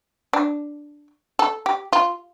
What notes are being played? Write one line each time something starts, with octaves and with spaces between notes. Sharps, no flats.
D4
A4
G4
F4